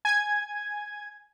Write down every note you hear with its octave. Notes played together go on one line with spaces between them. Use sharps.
G#5 G#6